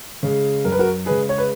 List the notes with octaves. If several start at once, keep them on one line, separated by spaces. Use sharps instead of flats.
C#3 G#3
F#2 A#4
B4
F#4 A#4
C#3 G#3 G#4 B4
C#5
B4